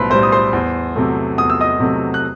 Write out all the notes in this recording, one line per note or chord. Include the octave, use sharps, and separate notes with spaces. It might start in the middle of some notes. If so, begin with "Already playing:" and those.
Already playing: B1 A2 G3 B4 C5 B5 C6
A2 G3 C5 C6
D#6
C5 C6
E2
C3 F#3 A3
E2 D#6
E6
D#5 D#6
C3 F#3 A3
F#6